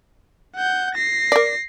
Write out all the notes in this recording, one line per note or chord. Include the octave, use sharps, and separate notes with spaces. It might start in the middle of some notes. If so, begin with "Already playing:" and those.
F#5 G6
A#6 C7
A#4 D5